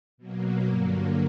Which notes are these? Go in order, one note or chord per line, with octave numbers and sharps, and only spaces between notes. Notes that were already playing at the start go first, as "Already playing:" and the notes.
B2 F#3 A#3
G2 D3 F#3 A#3